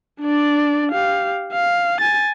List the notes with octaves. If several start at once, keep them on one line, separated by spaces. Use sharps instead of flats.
D4 D5
G4 F5
F5
G#5 A6